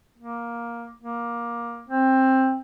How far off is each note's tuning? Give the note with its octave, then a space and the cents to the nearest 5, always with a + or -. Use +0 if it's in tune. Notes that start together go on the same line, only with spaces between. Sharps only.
A#3 +10
A#3 +15
C4 +15